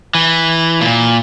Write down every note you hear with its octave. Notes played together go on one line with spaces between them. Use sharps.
E3
A#2